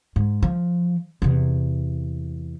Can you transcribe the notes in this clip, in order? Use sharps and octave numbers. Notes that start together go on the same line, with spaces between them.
G#2
F3
E2 C3